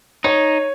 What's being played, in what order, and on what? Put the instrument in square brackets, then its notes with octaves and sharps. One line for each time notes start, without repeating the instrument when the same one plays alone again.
[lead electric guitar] D#4 [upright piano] C#5